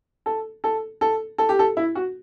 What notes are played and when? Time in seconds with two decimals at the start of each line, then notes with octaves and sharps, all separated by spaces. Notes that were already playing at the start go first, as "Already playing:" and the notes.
0.26 A4
0.64 A4
1.01 A4
1.38 A4
1.49 G4
1.59 A4
1.77 E4
1.95 F#4